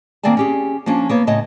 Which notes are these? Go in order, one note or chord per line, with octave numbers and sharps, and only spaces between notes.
D#3 A#3 C4 D5 G#5 A5
C#4 G4 G#4
F3 A#3 C#4 D4
A#3 B3 C#5
A2 C#3 C#5 D#5 A5